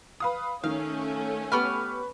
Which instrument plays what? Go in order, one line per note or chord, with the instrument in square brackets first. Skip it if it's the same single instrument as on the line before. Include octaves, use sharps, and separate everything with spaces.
[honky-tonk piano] B4 F5 D#6
[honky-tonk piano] D#3 [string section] A3 C#4 [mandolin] F5
[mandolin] B3 G4 F6 [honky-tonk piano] B4 C#6